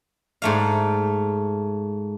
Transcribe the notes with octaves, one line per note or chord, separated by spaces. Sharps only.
G#2 A3 F5